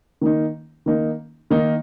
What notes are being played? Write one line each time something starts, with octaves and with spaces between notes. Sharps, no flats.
D#3 A#3 D#4
D#3 A#3 D#4
D#3 A#3 D#4